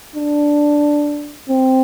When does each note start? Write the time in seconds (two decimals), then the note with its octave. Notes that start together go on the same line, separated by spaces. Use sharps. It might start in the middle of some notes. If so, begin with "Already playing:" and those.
0.16 D4
1.49 C4